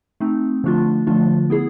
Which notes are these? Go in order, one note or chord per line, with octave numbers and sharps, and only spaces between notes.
A3 C4 D#4
D3 F3 A3 D4 F4
D3 F3 A3 D4 F4
B3 E4 G#4